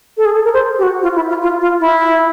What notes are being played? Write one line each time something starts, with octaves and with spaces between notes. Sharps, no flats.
A4
G#4
A4
A#4
C5
G4
F#4
F4
E4
F4
F4
F4
E4